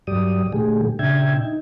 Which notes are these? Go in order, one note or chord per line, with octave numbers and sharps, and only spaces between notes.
G2 F#3 G4 D5 D#6
A#2 D3 G#3 A3 G4 G#4
A#2 C#3 D4 E5 G5 G#6
D#4